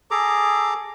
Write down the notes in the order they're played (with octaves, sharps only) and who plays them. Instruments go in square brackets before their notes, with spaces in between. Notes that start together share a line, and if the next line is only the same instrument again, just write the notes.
[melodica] G#4 A4 A#5 D6